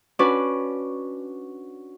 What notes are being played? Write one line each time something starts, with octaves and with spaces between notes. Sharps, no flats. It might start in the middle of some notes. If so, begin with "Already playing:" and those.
C#4 D4 F#4 B4 D5